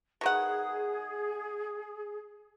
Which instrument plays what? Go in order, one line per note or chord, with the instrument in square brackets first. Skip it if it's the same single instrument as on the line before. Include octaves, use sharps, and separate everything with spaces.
[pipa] B2 D#3 F#5 [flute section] G#4